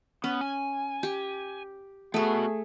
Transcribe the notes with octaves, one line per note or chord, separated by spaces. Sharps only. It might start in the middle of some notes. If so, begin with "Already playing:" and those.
B3 C#4
G#5
G4
A3 B3 F#4 G#4